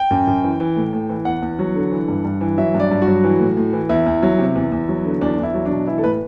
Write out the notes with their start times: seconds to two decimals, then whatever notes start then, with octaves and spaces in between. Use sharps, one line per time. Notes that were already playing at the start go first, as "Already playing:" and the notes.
Already playing: G5
0.11 F#2
0.27 F#2
0.44 E3
0.60 E3
0.76 A2
0.93 A2
1.09 E3
1.25 E2 F#5
1.42 E2
1.59 F#3
1.75 D3
1.92 E3
2.08 G2
2.25 G2
2.41 E3
2.58 F#3 E5
2.74 G2
2.80 D5
2.91 G2
3.02 F#4
3.07 F#3
3.24 E3
3.40 A2
3.57 A2
3.73 E3
3.89 E2 E4
4.06 E2
4.23 F#3
4.39 C3
4.55 E2
4.72 E2
4.89 F#3
5.05 D3
5.21 E2 D4
5.38 E2 E4
5.54 F#3
5.65 D4
5.71 B2
5.87 E3 E4
5.98 A4
6.04 A2 B4